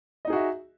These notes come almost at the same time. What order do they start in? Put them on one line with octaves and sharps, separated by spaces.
D#5 D#4 G#4 F#4 E5